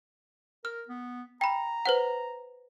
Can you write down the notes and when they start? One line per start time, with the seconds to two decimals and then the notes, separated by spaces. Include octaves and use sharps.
0.65 A#4 F6
0.88 B3
1.41 G5 A#5 B5
1.86 B4 C5 F#5